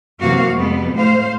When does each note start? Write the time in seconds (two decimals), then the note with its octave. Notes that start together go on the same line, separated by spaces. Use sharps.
0.19 F#2 C3 E3 A#3 F#4 F5
0.52 F2 G3 G#3 B3
0.96 A2 C5 F5